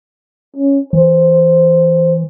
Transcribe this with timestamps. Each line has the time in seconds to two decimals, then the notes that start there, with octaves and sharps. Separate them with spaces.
0.56 C#4
0.93 E3 C5